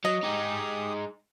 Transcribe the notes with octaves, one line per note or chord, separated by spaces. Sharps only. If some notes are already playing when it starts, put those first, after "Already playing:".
F#3 D#5
G#3 D#4 G4 D#6